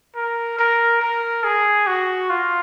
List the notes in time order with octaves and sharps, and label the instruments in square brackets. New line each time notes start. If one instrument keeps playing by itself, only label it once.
[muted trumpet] A#4
A#4
A#4
G#4
F#4
F4